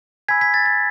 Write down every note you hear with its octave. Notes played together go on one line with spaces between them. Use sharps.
G#5 B5 E6 G#6 B6
G#6 B6
A6
A6